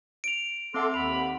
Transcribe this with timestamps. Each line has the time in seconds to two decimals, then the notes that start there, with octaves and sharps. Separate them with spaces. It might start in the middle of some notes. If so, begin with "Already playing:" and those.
0.24 D7 F7
0.74 C4 A4 E5 F#5 C6 D6
0.94 D#2 B5 F7